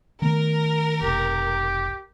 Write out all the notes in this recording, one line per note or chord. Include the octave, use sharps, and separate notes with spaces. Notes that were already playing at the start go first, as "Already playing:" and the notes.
D#3 A3 B3 A#4
F1 B1 G4